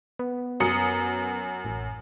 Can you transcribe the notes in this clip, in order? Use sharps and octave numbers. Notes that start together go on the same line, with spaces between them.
B3
F#2 D#6 C#7
A1